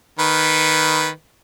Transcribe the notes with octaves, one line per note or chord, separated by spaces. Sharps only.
D#3 B4